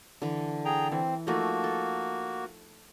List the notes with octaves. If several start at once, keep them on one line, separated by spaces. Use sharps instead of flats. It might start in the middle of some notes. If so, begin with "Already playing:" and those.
D3 E3
G#4 G5 A#5
E3 C4
F3 A3 A#3 D#4 F#4
A4